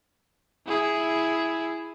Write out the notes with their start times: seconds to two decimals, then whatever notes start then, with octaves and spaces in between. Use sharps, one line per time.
0.67 E4 G#4